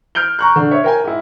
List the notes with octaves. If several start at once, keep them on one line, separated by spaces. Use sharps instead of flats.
F6 G6 D7 G7
A#5 C#6 F#6
D3
C#5 E5
A#4 G5 G#5
G#2 E4